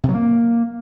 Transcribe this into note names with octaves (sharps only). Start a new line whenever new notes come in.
C3
F#3
A#3